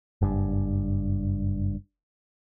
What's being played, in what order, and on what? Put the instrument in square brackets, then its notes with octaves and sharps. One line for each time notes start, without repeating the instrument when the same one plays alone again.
[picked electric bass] F#1 G2